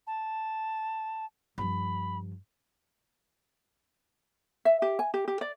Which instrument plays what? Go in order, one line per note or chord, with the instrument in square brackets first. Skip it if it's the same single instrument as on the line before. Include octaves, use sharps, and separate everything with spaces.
[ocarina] A5
[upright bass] G2 F3 [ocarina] B5
[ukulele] E5
G4
G#5
G4
G4
D5